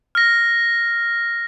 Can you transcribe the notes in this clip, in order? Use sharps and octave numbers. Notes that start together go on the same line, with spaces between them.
F6 A#6